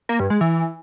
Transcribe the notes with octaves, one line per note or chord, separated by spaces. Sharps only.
A#3
G2
G#3
E3